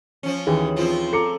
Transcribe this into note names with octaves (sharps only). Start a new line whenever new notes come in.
F3 C#4
D#2 E3 G#4
F3 C4 F4
A4 A#5 D6 C#7